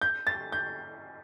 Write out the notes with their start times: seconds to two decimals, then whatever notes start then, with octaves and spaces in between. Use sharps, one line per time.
0.02 G6
0.27 A6
0.52 G6